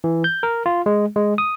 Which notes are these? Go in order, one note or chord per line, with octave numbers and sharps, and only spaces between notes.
E3
G6
A#4
F4
G#3
G#3
D#6